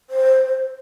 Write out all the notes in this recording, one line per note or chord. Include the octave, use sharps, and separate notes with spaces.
C5